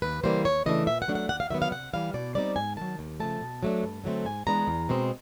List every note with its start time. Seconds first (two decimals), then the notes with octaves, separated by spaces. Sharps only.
0.02 D#2 B4
0.24 C#3 E3 G3 A#3 C5
0.45 D#2 C#5
0.66 C#3 E3 A3 D4 D#5
0.87 A#2 E5
1.02 F#5
1.08 F#3 A3 D4
1.15 F#5
1.29 D#2 F#5
1.40 F5
1.50 D#3 F#3 B3 E5
1.62 F5
1.71 C3 F#5
1.93 E3 G3 F5
2.14 B2 D5
2.35 G3 C4 D#4 D5
2.56 G#2 G#5
2.77 D#3 F#3 A5
2.99 D#2
3.20 C#3 F3 A3 A5
3.41 B2
3.63 F#3 A3 D4
3.83 G2
4.04 D3 F#3 A3 C4
4.25 G#2 G#5
4.47 E3 G#3 B3 D4 A#5
4.68 E2
4.89 B2 G#3 C4